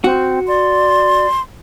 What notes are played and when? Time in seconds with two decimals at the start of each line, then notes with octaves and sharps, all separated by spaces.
0.04 C4 F#4
0.48 D5 C6